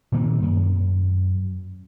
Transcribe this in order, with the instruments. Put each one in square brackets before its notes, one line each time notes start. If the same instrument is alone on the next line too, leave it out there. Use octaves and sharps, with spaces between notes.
[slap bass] A#2 D#3 A#3 C4
F#2